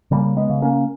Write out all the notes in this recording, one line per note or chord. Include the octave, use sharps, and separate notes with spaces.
C#3 G3 A#3
G#3 B3
C#3
A#3 C#4